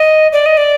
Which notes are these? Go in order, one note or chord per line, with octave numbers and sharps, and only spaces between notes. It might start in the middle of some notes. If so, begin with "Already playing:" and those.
Already playing: D#5
D5
D#5
D5